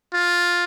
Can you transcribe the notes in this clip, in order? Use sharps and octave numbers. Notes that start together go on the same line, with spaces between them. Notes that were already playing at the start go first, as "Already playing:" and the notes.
F4